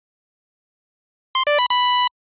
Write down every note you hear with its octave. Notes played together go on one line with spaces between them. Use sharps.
C6
D5
B5
B5